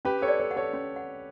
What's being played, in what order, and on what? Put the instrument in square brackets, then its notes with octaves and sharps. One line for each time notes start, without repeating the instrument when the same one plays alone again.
[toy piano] C#4 [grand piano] G4 B4
[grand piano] A4 C#5
[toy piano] D5
[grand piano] A4 C#5
[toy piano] F#5
[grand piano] A4 C#5
[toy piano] C#4
F#5